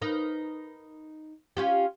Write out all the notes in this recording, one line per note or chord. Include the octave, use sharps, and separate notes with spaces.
D#4 A#4 B4
C#4 F4 G4